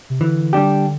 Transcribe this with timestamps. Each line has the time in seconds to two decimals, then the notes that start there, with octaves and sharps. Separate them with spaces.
0.10 C3
0.20 D3 E3
0.53 G3 D4 G4